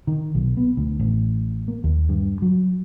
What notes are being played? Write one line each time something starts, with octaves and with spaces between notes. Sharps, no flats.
D#3
B1
B3
D2
A1
A#3
D#2
G2
F#3